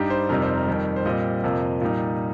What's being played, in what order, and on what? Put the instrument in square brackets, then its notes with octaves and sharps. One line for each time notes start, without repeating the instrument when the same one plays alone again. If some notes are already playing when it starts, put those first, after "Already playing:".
Already playing: [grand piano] G2 G3 D#4 G4
C5
F2 C3 G3 D#4 A#4
C5
A#4
F2 D#3 G3
C5
A#2 G3 C4 D#5
F2 C3 F3 A#3
A#2 G3 D#4